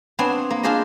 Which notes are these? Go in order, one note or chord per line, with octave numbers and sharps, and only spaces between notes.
B3 C4 D4 C#5 G#5 C6
A#3
D4 F4 G#4 C5 D5 D#5